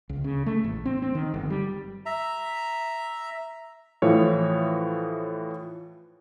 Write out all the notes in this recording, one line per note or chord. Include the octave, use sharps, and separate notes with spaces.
C#2
C#3
A3
A1
C4
C4
D#3
G1
G3
E5 A#5
A2 E3 F3 C#5 F5